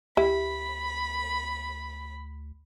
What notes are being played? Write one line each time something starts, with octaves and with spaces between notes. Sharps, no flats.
D2 E4 G4 B5